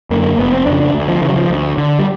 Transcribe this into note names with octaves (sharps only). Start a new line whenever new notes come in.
F#2 D3 A#3
F1 B3
C4
F2 C#3 D4
D4
D2
F3
C#3 E3
F#3
F3
D2
D3
G3